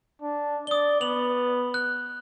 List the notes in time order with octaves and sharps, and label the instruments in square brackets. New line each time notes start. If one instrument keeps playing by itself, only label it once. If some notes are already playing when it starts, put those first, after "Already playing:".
[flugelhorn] D4
[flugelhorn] D5 [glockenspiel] D#6 G7
[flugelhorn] B3 [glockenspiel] F7 F#7
[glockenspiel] F#6